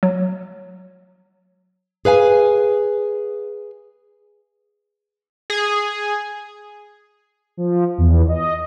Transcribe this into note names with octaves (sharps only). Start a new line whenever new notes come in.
F#3
G#4 B4 F5 G#5
G#4
F3
E2
D#5